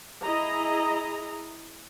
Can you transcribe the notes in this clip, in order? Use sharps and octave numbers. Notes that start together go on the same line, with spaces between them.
E4 G#4 D#5 A#5